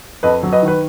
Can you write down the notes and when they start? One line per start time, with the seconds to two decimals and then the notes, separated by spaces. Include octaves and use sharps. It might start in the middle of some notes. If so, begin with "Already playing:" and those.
0.23 F2 B4 D#5
0.43 F#3
0.52 B4 D#5
0.62 D#3
0.68 B4